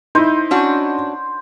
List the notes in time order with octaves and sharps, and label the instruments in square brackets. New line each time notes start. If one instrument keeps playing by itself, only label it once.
[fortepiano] D#4 E4 [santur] C5
[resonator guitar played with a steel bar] C#4 D4 F#4